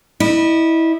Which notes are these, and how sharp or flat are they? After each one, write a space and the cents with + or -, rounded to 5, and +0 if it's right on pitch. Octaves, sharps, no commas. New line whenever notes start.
E4 -20 D#5 -35